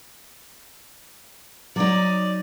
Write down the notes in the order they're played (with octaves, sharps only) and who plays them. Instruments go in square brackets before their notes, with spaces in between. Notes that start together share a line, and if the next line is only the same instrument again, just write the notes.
[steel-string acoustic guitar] F#3 D#4 [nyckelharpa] D5